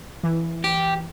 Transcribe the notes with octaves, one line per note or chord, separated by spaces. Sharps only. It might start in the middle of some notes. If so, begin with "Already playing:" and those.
E3
G4